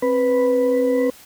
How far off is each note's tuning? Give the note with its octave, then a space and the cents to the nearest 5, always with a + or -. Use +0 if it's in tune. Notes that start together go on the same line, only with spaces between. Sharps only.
C4 +25 B4 +0